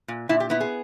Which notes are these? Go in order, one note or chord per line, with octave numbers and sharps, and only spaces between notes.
A#2
A#2 E4
G4
B3 E4
G#4